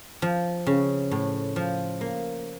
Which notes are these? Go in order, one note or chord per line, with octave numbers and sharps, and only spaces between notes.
F3
C#3
A2
F3
A#3